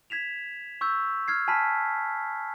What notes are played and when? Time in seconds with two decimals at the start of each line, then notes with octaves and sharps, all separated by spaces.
0.10 G#6 B6 E7 F7
0.81 C#6 E6 G6
1.28 F6 G#6 C7
1.48 G#5 A5 B5 F6 B6